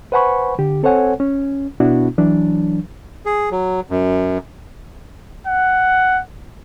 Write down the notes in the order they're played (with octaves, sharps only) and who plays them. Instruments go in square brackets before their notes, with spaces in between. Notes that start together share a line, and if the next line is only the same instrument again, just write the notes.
[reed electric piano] B4 C5 F#5 G#5 B5 C#6
D3 G4
C4 A4 C5 C#5 F#5 G#5
C#4
B2 B3 D4 E4 F#4
E3 F#3 D4
[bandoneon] G#4
F#3
F#2
[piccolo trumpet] F#5